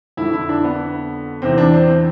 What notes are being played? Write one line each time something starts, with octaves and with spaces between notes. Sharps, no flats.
F2 D3 E4
E4
D4
B3
E2 C3 E3 C4
D4
C4